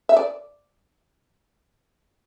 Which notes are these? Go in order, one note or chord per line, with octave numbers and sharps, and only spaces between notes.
E5
D5